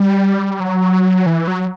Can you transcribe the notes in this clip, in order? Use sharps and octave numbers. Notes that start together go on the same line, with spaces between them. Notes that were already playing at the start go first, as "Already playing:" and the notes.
Already playing: G3
F#3
E3
F#3